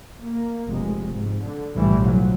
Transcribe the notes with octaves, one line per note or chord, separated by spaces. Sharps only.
A#3
F1 G#3
G#2
D3
F1 B1 A2 D3 E3 G3
F3 F#3